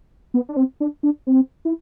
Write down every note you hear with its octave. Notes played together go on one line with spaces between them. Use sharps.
B3
D4
C4
D4
D4
C4
E4